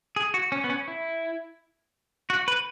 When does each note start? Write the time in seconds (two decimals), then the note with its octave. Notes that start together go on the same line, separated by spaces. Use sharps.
0.16 G#4
0.34 F#4
0.52 C#4
0.64 B3
0.70 C#4
0.88 E4
2.30 F#4
2.48 B4